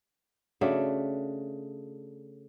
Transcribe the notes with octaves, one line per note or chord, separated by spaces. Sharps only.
C#3 A3 D4 F#4